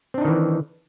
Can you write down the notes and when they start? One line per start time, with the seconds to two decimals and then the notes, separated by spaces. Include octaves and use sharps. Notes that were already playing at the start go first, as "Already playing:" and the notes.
0.14 C4
0.18 D4
0.21 D#4
0.25 D#3
0.28 E3